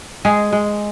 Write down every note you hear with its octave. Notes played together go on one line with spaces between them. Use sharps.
G#3 G#4
G#3